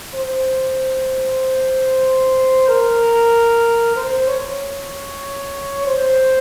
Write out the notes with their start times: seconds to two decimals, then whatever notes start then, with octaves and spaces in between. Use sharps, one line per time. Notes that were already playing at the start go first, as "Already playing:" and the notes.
0.15 C5
2.68 A#4
3.96 C5
4.27 C#5
5.86 C5